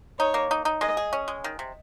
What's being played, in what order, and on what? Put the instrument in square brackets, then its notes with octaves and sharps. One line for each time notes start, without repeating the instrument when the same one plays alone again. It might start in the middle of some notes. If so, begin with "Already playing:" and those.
[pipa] D#4 [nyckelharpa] C#5
[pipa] A#3
D#4
D#4
[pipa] G#3 [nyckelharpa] D#5
[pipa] G#4
C#4
G#3
D#3
C3